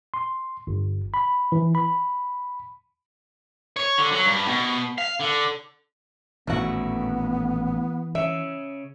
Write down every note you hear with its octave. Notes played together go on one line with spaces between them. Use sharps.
C6
G1
B5
E3
B5
C#5
D3
F#3
G2
B2
F5
D3
A1 D#2 A#2 E3 A3 B3 F#4
C#3 E5